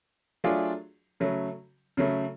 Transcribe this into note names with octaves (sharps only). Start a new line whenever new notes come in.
F#3 A3 D4 F4 G#4
C#3 F#3 A3
C#3 F#3 A3